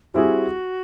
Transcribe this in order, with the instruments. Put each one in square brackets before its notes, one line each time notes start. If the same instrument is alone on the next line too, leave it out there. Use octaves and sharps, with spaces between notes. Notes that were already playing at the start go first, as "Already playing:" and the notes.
[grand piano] G3 C4 E4 G#4 [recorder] F#4